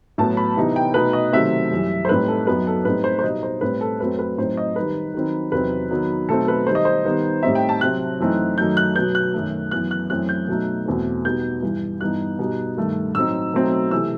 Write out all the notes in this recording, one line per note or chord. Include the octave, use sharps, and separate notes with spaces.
A2 F#3 B3 A5
B5
C3 E3 B3 D#4
G5
B2 A3 D#4 B4
D#5
C3 D#3 F#3 A3 C4 E5
F#2 E3 G3
C5
A2 G3 C4 D#4 B4
A4
F#2 F#3 B3 D#4 B4
A4
A2 G3 C4 D#4 B4
C5
C5
B2 G3 D#4 D#5
C5
A2 G3 C4 B4
A4
F#2 F#3 A3 C4 B4
B4
A2 F#3 C4 D#4 C5
D#5
D#3 G3 D#4 B4
D#3 F#3 C4 D#4
E2 C3 F#3 C4 D#4 B4
D#3 F#3 B3 D#4
B2 F#3 A3 C4 D#4 A4
B4
D#3 G3 D#4 C5
D#5
C5
D#3 G3 B3 D#4
A2 G3 C4 D#4 E5
G5
A5
C3 F#3 C4 F#6
F#2 E3 A3 C4 D#4
F#2 D#3 F#3 A3 D#4 G6
F#6
B2 F#3 B3 G6
F#6
F#2 D#3 A3
F#2 E3 B3 F#6
F#6
F#2 E3 A3 C4 F#6
G6
B2 F#3 A3 D#4
E2 B2 A3 C4
B2 G3 B3 D#4 G6
G2 E3 G3
G2 E3 B3 D#4 F#6
B2 G3 D#4
G2 D#3 A3
A2 F#3 C4 D#4 E6
B2 F#3 A3 C4 D#4
C3 E3 A3 E6